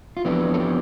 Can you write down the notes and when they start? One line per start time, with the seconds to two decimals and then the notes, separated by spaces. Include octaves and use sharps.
0.17 F4
0.25 F2 E3 B3 D4 G4
0.54 A4
0.59 G4